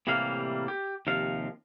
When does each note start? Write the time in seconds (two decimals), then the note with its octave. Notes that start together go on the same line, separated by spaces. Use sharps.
0.07 A2 C3 E3 G3 A#3 F5
0.68 G4
1.07 D#2 C3 F3 F5